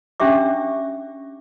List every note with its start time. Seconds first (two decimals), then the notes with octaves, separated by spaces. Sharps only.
0.20 C#4 D4 G4 E5 D6